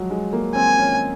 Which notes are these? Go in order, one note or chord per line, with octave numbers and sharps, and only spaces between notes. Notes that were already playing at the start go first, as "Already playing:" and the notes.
Already playing: F3 F#3 G#3
G#3
A#3
C4 G#5
C#4